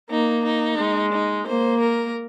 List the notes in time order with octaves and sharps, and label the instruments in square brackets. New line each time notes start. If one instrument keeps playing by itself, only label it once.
[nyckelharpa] A#3 [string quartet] D#4
[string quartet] D#4
[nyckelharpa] G#3
[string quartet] D#4
[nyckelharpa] A#3 [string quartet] C5
[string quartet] A#4